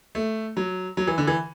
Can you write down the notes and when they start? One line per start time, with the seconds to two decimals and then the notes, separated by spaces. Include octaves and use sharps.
0.15 A3
0.57 F#3
0.97 F#3
1.07 E3
1.18 D3
1.27 E3